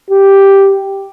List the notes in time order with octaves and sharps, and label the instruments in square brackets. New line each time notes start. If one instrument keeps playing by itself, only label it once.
[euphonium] G4